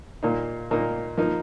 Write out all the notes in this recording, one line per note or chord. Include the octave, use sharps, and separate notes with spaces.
A#2 A#3 D#4
A#2 A#3 D#4
F3 A#3 D#4